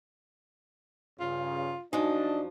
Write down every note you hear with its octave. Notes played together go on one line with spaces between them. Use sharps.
G2 C#3 F4
F#2 F3 D4 D#4 D#5